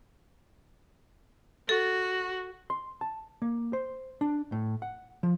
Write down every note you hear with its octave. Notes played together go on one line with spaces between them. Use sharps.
F#4 A4
C6
A5
A#3
C5
D4
A2
F#5
F3